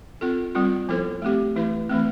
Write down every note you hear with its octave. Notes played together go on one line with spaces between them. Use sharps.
C4 F4 A4
G3 C4 F4
F3 B3 E4 A4 C5
A3 C4 G4
E3 A3 E4 B4
E3 A3 C4